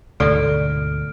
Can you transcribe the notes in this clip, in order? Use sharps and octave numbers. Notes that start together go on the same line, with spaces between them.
D2 G#2 B2 A4 D5 F6 D7